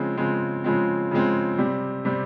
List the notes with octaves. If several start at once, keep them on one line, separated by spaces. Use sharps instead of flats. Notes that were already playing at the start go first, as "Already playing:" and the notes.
Already playing: C#3 F3 G#3 C4
C#3 F3 G#3 C4
C#3 F3 G#3 C4
C#3 F3 G#3 C4
C3 G3 C4
C3 G3 C4